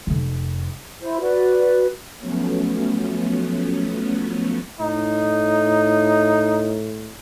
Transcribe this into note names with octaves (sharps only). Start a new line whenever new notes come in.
F1 F2
E4 C5
F#4 B4 D5
F3 F#3 A3 B3 C#4
A2 D#4